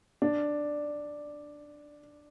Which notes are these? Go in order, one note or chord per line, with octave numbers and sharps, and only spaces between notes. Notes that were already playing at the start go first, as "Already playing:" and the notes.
D4